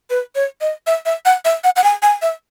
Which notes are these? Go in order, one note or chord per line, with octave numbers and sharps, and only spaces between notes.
B4
C#5
D#5
E5
E5
F#5
E5
F#5
F#5
G#5
G#5
E5